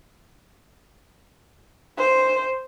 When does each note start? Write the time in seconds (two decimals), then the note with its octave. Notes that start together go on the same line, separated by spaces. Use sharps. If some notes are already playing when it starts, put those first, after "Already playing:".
1.98 C5